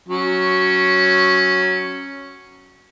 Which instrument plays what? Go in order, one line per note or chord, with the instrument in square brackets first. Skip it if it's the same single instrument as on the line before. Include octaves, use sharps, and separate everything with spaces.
[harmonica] F#3 C#4